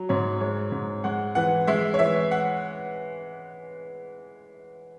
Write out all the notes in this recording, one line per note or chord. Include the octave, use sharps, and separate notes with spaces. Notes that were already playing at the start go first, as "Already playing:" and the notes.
Already playing: F#3
G#2 C#5
G#3 C#5
G#2
G#3 F#5
E3 F#5
G#3 E5
C#5
E3 E5
F#5